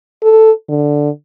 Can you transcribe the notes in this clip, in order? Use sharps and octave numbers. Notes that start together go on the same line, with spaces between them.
A4
D3